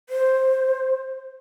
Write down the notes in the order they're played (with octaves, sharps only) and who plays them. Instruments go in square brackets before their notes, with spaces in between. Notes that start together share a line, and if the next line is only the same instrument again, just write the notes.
[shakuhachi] C5